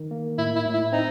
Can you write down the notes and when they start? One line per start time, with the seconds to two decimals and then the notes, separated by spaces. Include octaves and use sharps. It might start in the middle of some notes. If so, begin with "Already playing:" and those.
Already playing: D#3
0.11 A#3
0.38 A2 E4
0.56 E4
0.66 A2
0.74 E4
0.92 C4 D#4